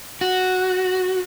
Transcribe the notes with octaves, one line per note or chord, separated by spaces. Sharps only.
F#4